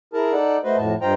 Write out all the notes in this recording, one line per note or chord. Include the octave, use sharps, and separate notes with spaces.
E4 G#4 A#4 A5
D#4 A4 D5 F#5
A3 F#4 B4 C5 D#5
F2 A2 F#4 A5
G2 F4 C5 D#5 G5 A#5